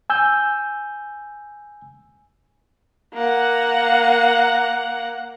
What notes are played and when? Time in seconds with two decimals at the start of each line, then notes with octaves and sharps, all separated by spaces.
0.10 G#5 E6 G6
3.14 A#3 F#5